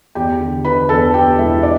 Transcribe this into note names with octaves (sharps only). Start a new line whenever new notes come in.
E2 G4 G5
D3
D3 B4 B5
E2 A4 A5
E2 G4 G5
E1 E4 E5
D4 D5